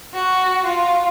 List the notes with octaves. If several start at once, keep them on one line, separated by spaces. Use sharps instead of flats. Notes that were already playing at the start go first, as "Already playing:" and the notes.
F#4
F4